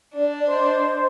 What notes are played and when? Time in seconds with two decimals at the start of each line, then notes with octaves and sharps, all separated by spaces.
0.14 D4 D5
0.47 C5 D#5